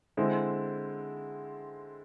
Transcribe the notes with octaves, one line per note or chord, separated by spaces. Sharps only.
D3 G#3 C4 E4